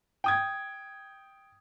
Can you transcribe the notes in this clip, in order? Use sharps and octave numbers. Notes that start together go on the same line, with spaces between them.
G5 D#6 G#6